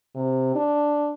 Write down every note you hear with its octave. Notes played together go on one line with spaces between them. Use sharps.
C3
D4